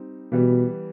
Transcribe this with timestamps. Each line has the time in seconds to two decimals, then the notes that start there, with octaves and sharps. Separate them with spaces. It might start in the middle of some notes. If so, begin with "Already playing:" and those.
Already playing: G3 C4 D#4
0.32 B2 E3 G3 B3